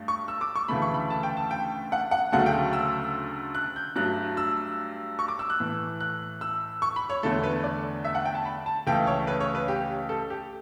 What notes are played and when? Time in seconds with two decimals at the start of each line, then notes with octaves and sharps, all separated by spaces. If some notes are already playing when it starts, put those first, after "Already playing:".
Already playing: G2 A3
0.08 C#6
0.28 E6
0.41 D6
0.56 C#6
0.68 D2 C#3 E3 A3 B5
0.82 C#6
0.94 B5
1.10 A5
1.23 G5
1.37 A5
1.51 G5
1.92 F#5
2.11 F#5
2.32 D2 C#3 F#3 A3 F#5
2.46 G5
2.73 E6
3.55 F#6
3.76 G6
3.96 G2 F#3 A3 F#6
4.37 E6
5.19 C#6
5.28 D6
5.39 E6
5.50 F#6
5.60 A2 E3 A3
6.00 F#6
6.41 E6
6.82 C#6
6.96 B5
7.10 C#5
7.23 E2 D3 A3 A4
7.43 B4
7.63 D5
8.05 E5
8.15 F#5
8.25 G5
8.35 A5
8.45 B5
8.66 A5
8.87 C#2 C#3 E3 A3 G5
9.07 C#5
9.27 B4
9.41 C#5
9.55 B4
9.68 G4
10.09 A4
10.30 G4